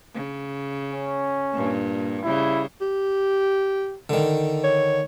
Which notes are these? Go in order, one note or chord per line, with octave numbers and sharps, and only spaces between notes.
C#3
C#4
G2 A#2
C#3 G3 E4
G4
D3 D#3
C#5